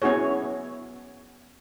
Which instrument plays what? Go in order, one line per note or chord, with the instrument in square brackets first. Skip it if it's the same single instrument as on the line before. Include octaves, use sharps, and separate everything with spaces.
[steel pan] B3 C#4 E4 F#4 G#4 C#5